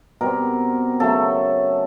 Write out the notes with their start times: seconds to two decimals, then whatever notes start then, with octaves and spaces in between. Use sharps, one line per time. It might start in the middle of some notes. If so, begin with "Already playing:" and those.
0.21 B2 G3 C4 A#4
1.00 C#3 F#3 A3 A4